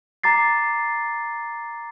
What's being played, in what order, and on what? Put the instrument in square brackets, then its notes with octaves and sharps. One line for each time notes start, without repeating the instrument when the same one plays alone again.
[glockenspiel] A#5 D6 A6 C7